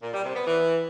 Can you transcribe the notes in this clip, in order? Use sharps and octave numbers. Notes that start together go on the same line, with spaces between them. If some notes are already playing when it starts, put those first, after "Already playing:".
A#2
G3
C3
B3
E3